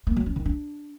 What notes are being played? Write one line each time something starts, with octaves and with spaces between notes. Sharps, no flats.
A#3
F#3
C#4
D#3
D4